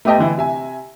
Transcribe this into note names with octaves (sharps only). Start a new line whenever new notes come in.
A3 B3 G4 D#5 G5 A5
D3 E3 E4
C3 E5 G#5